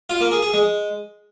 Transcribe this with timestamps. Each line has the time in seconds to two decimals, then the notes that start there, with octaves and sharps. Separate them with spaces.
0.10 F4
0.21 A#3
0.32 G#4
0.43 G#4
0.54 G#3